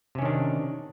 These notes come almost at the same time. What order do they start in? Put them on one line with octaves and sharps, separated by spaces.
C3 C#4 D#3 D4